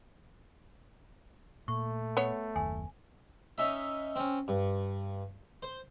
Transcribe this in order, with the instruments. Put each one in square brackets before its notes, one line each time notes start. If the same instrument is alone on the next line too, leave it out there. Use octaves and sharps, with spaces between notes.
[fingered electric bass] A#2 [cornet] A3 [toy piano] C#6
[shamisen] B3 C#5
[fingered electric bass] F#1 D#2 [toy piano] G#5
[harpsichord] C#4 D#4 E5
C4 C#4
G2
C5